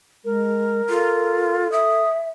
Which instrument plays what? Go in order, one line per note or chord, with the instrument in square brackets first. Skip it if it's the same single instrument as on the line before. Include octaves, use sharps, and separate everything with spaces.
[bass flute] G#3 [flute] A#4
[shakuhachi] F4 [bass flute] A4
[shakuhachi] E5 [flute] D#6